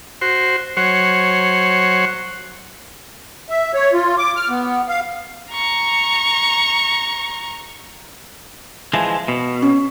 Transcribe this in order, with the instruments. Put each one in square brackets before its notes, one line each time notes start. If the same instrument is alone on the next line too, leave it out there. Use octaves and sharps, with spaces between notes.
[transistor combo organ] F#4 C5
F#3 C5 C#5 F#5
[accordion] E5
C#5
F4
D6
F6
B3
F5
[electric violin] A#5 C#6
[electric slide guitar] E3 F3 G#3
B2
[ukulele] C#4